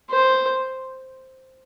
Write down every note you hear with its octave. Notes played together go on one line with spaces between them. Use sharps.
C5